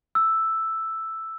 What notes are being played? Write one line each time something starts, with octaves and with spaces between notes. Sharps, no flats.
E6